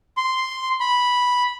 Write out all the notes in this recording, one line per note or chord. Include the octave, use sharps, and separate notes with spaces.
C6
B5